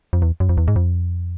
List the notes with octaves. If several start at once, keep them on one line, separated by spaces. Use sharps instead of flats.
F2
E2
F#2
F2
E2
G#2
F2